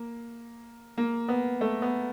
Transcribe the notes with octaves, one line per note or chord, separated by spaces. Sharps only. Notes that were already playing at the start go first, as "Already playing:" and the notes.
Already playing: A#3
A#3
B3
A3
B3